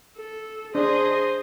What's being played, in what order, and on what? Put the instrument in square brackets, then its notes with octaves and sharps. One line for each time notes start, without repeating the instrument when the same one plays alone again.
[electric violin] A4
[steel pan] D4 [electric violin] G#4 D#5 [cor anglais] C5